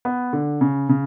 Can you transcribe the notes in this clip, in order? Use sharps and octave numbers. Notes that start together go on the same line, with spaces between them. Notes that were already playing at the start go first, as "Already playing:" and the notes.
B3
D3
C#3
C#3